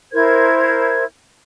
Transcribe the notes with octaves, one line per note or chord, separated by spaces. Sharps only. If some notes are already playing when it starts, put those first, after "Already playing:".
E4 A#4 C5 G#6